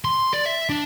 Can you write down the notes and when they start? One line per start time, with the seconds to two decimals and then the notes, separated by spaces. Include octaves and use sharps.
0.05 C6
0.33 D5
0.46 E5
0.69 D4